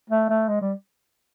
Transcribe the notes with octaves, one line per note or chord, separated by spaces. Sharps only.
A3
A3
G#3
G3